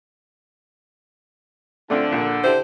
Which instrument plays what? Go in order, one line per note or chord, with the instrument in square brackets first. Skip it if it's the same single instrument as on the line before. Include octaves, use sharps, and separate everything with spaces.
[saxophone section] D3 [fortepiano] A3 C4 F4
[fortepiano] A#1 A#2
[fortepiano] E4 G4 A4 [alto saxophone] C5